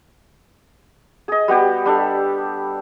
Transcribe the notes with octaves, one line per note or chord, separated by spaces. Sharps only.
G#4 D#5
G3 B3 F#4 G4
G3 D4 A4